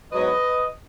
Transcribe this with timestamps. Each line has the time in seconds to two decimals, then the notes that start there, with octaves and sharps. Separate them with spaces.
0.12 G#2 F#3 B3 B4 D#5